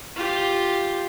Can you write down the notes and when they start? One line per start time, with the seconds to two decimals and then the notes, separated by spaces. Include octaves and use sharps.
0.16 F4 G4